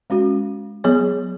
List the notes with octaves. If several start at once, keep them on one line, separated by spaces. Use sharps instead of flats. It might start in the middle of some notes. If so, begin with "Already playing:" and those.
G#3 C#4 F#4
F#3 B3 G#4 C#5